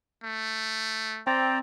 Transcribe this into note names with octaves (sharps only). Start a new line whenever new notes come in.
A3
C4 D5 G5 A#5